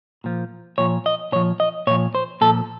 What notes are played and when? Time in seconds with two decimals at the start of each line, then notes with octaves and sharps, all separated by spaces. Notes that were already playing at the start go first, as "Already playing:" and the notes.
0.24 A#2 F3
0.78 A#2 F3 C#5
1.06 D#5
1.32 A#2 F3 C#5
1.60 D#5
1.87 A#2 C#5
1.91 F3
2.15 C5
2.41 A#2 F3 A4